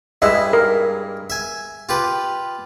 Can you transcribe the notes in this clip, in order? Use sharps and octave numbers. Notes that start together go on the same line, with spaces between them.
G2 G#3 E4 D#5 E5
A#4
E5 G#5
F4 G4 B4